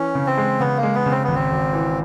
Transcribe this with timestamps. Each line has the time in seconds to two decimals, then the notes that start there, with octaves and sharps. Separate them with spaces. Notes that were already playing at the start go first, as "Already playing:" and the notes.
Already playing: E3 C#4
0.15 C#3
0.27 C4
0.38 G#3
0.60 C#3 B3
0.77 A#3
0.83 G#3
0.95 B3
1.06 C#3
1.11 C4
1.24 G#1 B3
1.35 C4
1.51 G#1
1.73 E3